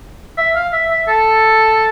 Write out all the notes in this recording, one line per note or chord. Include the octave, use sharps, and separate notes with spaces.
E5
F5
E5
E5
A4